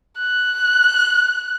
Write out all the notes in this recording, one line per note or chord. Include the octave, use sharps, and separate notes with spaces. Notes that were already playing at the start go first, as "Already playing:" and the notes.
F#6